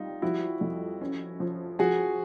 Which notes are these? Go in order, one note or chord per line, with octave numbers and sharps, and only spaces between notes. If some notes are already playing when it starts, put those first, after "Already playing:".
Already playing: G3 D#4 F4
F3 E4 F#4
F2
C#4
F3
F3 F#4 G#4